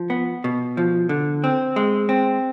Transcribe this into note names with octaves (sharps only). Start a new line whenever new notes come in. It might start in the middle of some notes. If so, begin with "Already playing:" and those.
Already playing: F3
B3
B2
F3
D3
C4
G#3
C4